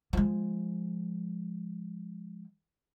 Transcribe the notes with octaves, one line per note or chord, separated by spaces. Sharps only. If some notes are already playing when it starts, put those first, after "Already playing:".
F3 G#3